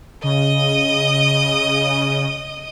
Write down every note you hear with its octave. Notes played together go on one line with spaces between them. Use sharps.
C#3 D#5 D#6